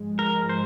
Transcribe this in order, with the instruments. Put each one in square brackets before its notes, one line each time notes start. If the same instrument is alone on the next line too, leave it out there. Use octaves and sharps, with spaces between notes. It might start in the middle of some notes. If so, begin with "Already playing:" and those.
Already playing: [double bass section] G#2 F3 G#3
[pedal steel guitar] A#4
C5